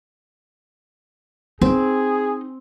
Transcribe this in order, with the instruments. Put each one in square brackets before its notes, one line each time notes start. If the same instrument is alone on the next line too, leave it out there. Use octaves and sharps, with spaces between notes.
[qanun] C4 [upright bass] D#4 [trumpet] G#4